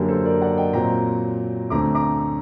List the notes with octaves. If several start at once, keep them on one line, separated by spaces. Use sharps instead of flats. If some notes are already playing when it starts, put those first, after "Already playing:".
Already playing: F#2 D3 F#3 A#3 G4 A#4
A4 C5
A#4 D5
D5 F#5
D#5 G5
A#2 F#3 C4 G5 A#5
D2 D3 A3 C4 A#5 D6
A#5 D6